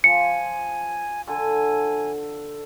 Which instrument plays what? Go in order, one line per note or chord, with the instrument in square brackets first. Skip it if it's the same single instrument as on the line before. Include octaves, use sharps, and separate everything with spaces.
[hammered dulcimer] F3 [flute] G#5 [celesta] C#7
[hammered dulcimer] D3 A4 [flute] G#5